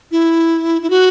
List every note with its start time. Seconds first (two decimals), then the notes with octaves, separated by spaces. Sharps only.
0.12 E4
0.82 E4
0.90 F#4